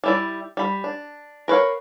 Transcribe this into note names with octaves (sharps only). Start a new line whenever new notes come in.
G3 E4 D5
G3 B5
D4
A#4 B4 C#5 F5